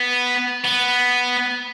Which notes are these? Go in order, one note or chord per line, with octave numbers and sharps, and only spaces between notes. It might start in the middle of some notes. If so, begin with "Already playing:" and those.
Already playing: B3
B3